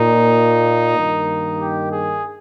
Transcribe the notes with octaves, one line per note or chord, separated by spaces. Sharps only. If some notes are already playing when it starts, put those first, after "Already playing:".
Already playing: A#2 A#3 D#4
G2 D#3 A#3
G4
G#4